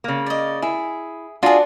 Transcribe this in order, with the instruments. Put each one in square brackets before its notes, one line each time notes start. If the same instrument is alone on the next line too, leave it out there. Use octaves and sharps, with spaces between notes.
[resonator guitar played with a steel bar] C#3 A#3
[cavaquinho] D5 D#5
[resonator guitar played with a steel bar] E4 [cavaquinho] G#4
[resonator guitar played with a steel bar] D4 F#4 [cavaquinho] F4 G#4